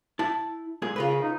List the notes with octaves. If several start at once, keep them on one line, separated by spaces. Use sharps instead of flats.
E4 A5
A#2 G#3 G#4
C#3 F4 A#4 B4
D#4